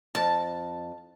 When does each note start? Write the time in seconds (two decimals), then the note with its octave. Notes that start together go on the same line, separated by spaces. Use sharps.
0.15 F2 A5